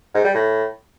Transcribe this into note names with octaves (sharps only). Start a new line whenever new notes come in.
G#2
G3
A2